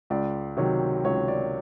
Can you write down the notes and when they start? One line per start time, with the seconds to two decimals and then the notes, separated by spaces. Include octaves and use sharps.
0.10 C#2 D5
0.57 C3 D#3 F#3 C#5
1.04 C#2 C#5
1.28 D5